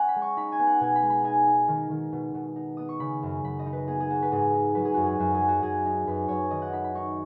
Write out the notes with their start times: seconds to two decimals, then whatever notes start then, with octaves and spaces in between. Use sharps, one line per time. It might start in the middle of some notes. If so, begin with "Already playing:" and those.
Already playing: C#4 D#5 F#5 G#5
0.08 B5
0.16 G#3
0.22 C#6
0.37 D#4 B5
0.52 G#5
0.59 B3
0.67 F#5
0.81 B2 G#5
0.96 B5
1.02 G#3
1.10 B5
1.24 D#4 G#5
1.47 D#4
1.68 D#3
1.91 D#3
2.12 B2
2.34 B2
2.56 D#4
2.77 B3 D#6
2.89 C#6
3.00 C#3 B5
3.23 F#2
3.44 F#2 B5
3.59 D#5
3.66 D#4
3.73 B4
3.87 B3 G#4
4.00 G#4
4.10 B3 F#4
4.22 B4
4.32 G#2 G#4
4.54 D#4
4.75 F#3 B4
4.85 G#4
4.94 F#2 F#4
5.04 G#4
5.19 F#2 F#4
5.35 G#4
5.41 F#3
5.48 F#4
5.63 F#2 G#4
5.85 D#4
6.07 F#2 B4
6.28 F#2 C#5
6.51 D#3 D#5
6.62 F#5
6.72 D#4 B5
6.84 B5
6.95 D#4 C#6